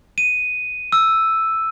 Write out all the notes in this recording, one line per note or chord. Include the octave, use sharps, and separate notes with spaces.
D#7
E6